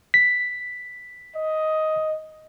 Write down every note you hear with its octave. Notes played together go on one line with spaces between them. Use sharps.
B6
D#5